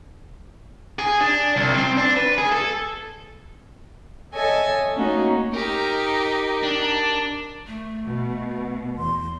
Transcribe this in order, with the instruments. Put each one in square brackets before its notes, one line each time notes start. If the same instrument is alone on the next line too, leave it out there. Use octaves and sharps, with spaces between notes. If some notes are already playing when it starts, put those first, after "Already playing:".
[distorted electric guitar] G#4
D4
C2
C4
D4
B4
G#4
A4
[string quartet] A4 C#5 D#5 E5 G#5 A5
A3 A#3 C#4 D#4 F#4
[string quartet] D#4 G4 [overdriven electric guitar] A#4
[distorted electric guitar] D4
[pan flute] A3
[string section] B2
[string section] E2 [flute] C6